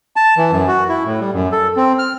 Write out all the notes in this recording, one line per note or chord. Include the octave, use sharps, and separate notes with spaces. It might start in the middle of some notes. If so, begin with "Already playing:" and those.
A5
E3
F#2
F#4
E4
A2
G3
F#2
A4
C4
F6